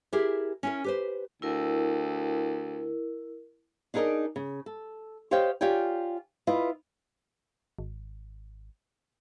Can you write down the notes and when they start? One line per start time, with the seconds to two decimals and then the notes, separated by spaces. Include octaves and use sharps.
0.13 E4 G4 G#4 A#4
0.63 C#4 E4 A#4
0.84 G4 B4 C5
1.42 D2 E4 A#4
3.94 D4 D#4 G#4 A#4 D5 D#5
4.36 C#3
4.66 A4
5.31 G4 C5 C#5 D#5 F5 G5
5.61 F4 G4 C#5 D5 G5 G#5
6.47 E4 F4 B4 D#5 F5
7.79 G#1